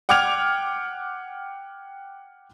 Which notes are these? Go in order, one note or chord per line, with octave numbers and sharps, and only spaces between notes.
F#5 G5 D6 F6 G#6 F7